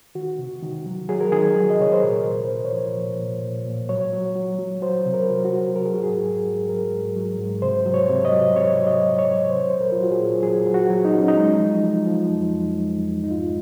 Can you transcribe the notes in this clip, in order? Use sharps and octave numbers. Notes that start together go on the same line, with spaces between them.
D#3 F#4
C3
D#3
F#3
F#3 G#4
A#4
D#3 G#4
F#3
D#5
C3 C#5
C5
A#2 A#4
A#2
C5
A#2
C#5
F3
A#2
A#2
A#2
A#2
F#3 C#5
F#3
F#3
F#3
F#3 C5
C3
A#4
F#3
F#4
F#3
F#3 A#4
G#4
F#4
G#2 G#4
G#2
G#2
F#3 A#4
G#2
F#3
G#2
C3 C5
F#3
C#5
C3
D#5
F#3
C3 C#5
F#3
D#5
F#3
C#5
F#3
F#3 C5
C#5
A#2 C5
A#4
F#3 F4
F#4
G#4
A#2
F#3 G#4
F#3
F#4
F#3
D#4
F#3 C#4
D#4
G#3
F3
F3
F3
F2
F2
G#3
F2
G#2 D#4
F4
D#4
G#3